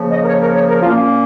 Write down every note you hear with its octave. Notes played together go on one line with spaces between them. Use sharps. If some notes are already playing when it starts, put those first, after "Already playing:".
Already playing: C#3 F3 A#3
D#5
A#4
C#5
A#4
C#5
A#4
A#2 A#3 C#4 F4